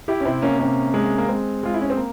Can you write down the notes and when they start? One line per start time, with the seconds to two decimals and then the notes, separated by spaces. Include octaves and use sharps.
0.08 E4 G4
0.20 C#4
0.25 C3 C4 E4
0.42 A#3 C#4
0.59 C3 A#3 C#4
0.94 G#3
1.18 A#3
1.29 G#3 C4
1.63 G#3 F4
1.74 E4
1.81 C#4
1.90 C4
1.97 A#3